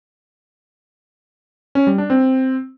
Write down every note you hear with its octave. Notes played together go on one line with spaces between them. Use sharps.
C#4
G3
D4
C4